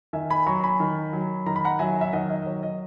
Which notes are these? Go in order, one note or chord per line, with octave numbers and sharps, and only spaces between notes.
D#3 E5 G#5
G#5 B5
F#3 A#5 C#6
G#5 B5
D#3
F#3
D#3 A#5
B5
F#5 A#5
F#3 E5 G#5
E5
D#3 D#5 F#5
D#5
D#5
F#3 C#5
D#5